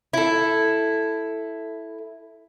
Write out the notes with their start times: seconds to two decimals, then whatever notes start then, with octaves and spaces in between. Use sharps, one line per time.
0.14 E4 A4